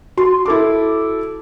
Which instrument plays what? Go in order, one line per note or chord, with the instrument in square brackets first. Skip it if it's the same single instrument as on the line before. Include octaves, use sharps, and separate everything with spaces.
[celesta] F#4 [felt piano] C6
[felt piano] E4 A4 D6